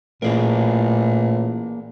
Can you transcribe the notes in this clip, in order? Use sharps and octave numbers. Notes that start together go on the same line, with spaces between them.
A1 A#2 A#3 G#4 A#4